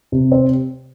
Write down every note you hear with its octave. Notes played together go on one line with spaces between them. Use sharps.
C3
C4